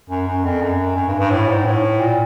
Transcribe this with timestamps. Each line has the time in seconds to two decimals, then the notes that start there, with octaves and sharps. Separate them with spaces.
0.10 F#2
0.27 F#2
0.44 F2
0.62 F#2
0.96 F#2
1.08 G2
1.19 G2
1.30 A2
1.49 G#2
1.65 A2
2.00 A#2